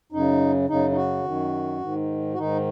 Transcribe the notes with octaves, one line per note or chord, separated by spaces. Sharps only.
F#2 C#3 D#4
F#2 C#3 D#4
D#4
F#4
F#2 D#3
G#2 D#3
F#4
G#2 D#3 D#4